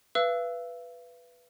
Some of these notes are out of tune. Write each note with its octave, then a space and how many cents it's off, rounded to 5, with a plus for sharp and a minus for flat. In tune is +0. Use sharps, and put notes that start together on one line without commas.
B4 +0 F5 -45 E6 +0